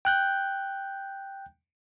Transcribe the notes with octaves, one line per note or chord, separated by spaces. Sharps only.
G5 F#6 G6